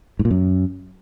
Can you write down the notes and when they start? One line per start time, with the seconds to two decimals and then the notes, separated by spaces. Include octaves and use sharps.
0.19 G#2
0.25 A#2
0.30 F#2